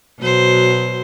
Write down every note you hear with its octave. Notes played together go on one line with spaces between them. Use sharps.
B2 F#3 C5